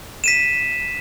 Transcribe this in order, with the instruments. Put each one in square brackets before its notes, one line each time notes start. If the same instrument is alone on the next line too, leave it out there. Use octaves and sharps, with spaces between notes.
[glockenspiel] B6 D#7 E7